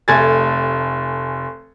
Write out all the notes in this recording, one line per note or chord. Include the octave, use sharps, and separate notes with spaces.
F1 A3 G#5 G#6 A6